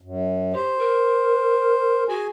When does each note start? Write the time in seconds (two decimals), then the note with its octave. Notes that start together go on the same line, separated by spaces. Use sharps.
0.01 F#2
0.54 G4 C5
0.79 A#4
2.09 F#4 G#4 G#5